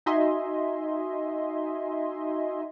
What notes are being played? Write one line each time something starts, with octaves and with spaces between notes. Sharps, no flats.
D#4 F#4 D#5 E5 G#5 C6